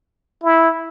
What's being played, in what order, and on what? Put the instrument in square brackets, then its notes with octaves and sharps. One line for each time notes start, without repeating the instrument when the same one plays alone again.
[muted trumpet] E4